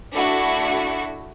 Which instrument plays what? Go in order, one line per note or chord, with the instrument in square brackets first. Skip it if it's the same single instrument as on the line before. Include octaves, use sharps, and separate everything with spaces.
[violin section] A3 D4 E4 F#4 C#7